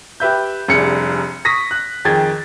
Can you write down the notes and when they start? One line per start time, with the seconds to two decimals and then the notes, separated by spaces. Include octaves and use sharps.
0.20 G4 B4 E5 G6
0.68 F1 C2 D4 G#4 C#7
1.45 C#6 D#6 A#6 B6
1.71 F#6
2.05 F2 D#3 G#4 G5 G#6 A6